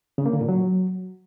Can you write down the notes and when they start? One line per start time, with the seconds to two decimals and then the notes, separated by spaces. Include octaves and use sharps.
0.18 C#3
0.26 A#3
0.33 D3
0.41 A#2
0.49 F#3